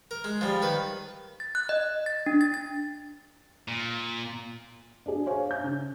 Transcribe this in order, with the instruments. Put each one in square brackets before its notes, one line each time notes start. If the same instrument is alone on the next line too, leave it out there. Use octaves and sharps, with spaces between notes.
[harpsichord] A#4
G#3
F3 G3
D#3 B4
[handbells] A6
F#6
D#5
A6
D4
A6
A6
[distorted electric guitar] A#2
[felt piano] D4 F#4 G#4
C5 C#5 F5 G#5
G6
C#3